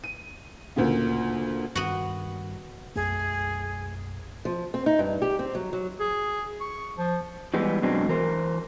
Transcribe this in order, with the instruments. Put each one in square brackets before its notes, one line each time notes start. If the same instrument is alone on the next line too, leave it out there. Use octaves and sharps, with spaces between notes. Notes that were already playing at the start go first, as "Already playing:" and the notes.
[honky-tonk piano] D#7
D2 A#2 C#3
[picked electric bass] G2 D#3 [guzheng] B3 F#4
[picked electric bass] B1 F#2 A3 [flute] G#4
[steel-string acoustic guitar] F3
C4
D#4
G2
G4
C4
F#3
F#3
[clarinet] G#4
C#6
F3
[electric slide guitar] E3 G3 G#3 B3
F#2 B2 G#3 C4 D4
E3 A#4 C5